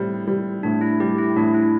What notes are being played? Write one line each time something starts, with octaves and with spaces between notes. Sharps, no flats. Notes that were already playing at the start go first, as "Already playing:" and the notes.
Already playing: A2 G3 C4
G3
A2 D4
E4
G3 G4
E4
A2 D4
E4